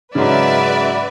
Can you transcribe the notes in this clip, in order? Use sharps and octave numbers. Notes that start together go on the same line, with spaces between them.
G#2 C#3 F#3 B4 D5 E5